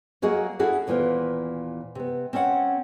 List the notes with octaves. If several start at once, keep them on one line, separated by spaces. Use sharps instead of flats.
F#3 A#3 F#4 G#4 D#5
C#4 E4 F#4 G#4 A4
D#2 A#2 E3 B3 F4 C5
C3 B3
C4 C#4 C#5 D#5 F#5